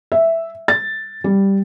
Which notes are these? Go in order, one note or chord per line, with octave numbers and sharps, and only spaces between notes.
E5
A6
G3